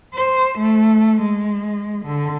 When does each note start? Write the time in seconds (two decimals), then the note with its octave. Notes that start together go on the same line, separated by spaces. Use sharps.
0.15 C5
0.58 A3
1.21 G#3
2.05 D3